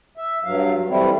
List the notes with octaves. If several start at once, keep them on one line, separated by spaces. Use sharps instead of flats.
E5
G2 F#3 F5
E3 G3 A3 C4 E4